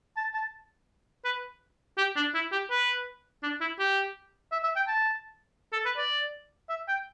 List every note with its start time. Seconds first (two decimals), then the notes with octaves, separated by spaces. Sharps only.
0.17 A5
0.34 A5
1.25 B4
1.98 G4
2.16 D4
2.34 E4
2.52 G4
2.70 B4
3.42 D4
3.61 E4
3.79 G4
4.52 E5
4.63 E5
4.76 G5
4.87 A5
5.73 A4
5.85 B4
5.97 D5
6.69 E5
6.88 G5